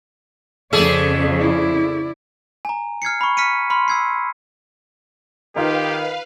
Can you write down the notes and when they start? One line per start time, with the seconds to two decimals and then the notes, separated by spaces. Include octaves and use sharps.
0.73 F2 C#3 A3 G#4 A4 D5
1.39 E4 D5
2.65 G#5 A#5
3.02 F6 G#6 C7 C#7
3.21 B5 C#6
3.37 F6 B6 C#7 D#7
3.70 B5 C6 F6
3.88 E6 G#6 C7
5.56 D#3 D#4 F4 G4 B4 F5